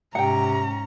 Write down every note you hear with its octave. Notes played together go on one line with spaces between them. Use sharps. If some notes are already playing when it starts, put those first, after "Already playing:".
G#2 C3 C#4 F#5 G5 A#5